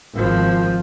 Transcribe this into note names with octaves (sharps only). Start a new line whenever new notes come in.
G#1 F3